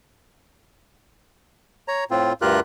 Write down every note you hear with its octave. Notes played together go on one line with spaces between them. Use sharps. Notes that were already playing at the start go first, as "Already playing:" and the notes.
C#5 A#5
A2 C4 F4
D2 G2 F4 G4 A#4 F#6